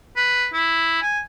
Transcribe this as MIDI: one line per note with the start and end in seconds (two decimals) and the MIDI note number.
0.16 0.47 71
0.53 1.00 64
1.02 1.19 80